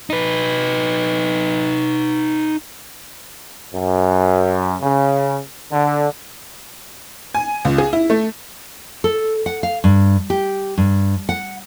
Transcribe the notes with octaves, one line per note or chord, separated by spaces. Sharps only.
D#4 B4
F#2
C#3
D3
G#5
C#2
G#4
E4
A3
A4
F#5
F5
G2
G4
G2
F#5